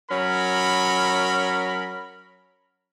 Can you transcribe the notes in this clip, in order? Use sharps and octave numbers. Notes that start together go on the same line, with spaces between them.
F#3 C#4 A#4 B5